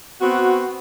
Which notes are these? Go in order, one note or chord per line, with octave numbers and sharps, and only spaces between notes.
B3 C4 F#4